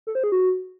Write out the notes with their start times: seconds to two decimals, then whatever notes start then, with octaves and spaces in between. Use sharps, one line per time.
0.07 A4
0.15 C5
0.24 G#4
0.32 F#4